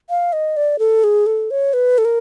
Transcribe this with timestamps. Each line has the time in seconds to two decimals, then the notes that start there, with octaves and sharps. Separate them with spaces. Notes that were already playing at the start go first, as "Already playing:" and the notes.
0.10 F5
0.33 D#5
0.57 D5
0.79 A4
1.04 G#4
1.26 A4
1.51 C#5
1.73 B4
1.98 A4
2.05 A#4